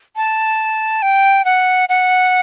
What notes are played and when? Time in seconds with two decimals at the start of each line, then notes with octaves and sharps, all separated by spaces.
0.16 A5
1.02 G5
1.45 F#5
1.89 F#5